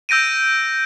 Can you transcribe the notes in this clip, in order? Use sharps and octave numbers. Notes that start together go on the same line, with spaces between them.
E6 G6 A#6 D7 D#7